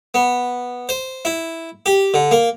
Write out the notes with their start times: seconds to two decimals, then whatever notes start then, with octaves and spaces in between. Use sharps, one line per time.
0.14 B3
0.89 C5
1.25 E4
1.86 G4
2.14 D3
2.31 A#3